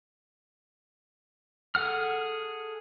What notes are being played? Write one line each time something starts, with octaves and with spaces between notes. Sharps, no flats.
G#4 A4 F#5 F6